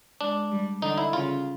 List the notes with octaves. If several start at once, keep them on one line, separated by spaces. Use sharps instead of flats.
G#3 D4
G3
D3 D#4
E4
C#3 F4